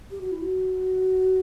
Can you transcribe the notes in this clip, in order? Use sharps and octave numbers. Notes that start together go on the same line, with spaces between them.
G4
F#4
E4
F#4